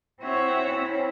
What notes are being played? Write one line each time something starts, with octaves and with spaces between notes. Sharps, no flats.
C4 E4 F#4 C#5 E5 F#5
C4 C#4 E4